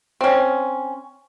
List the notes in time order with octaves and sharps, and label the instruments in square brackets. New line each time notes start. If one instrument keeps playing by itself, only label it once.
[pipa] C4 C#4